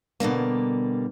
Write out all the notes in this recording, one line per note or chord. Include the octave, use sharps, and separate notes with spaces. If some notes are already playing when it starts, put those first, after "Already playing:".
B2 D3 G3 A#3